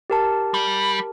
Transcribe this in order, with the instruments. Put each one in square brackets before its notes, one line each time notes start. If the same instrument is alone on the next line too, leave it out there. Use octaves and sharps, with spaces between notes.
[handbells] G4 A#4 A5
[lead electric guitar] G3